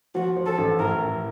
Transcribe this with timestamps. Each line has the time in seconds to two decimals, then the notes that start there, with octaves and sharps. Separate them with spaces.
0.15 F3 F#4
0.37 F3
0.46 A4
0.58 A1
0.79 A2 A#4
1.01 A1